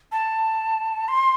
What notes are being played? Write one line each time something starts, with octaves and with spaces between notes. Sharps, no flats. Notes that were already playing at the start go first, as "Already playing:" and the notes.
A5
C6